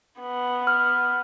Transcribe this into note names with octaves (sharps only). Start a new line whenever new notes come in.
B3
F6